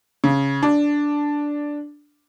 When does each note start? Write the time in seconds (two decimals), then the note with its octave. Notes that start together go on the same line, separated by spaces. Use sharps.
0.24 C#3
0.63 D4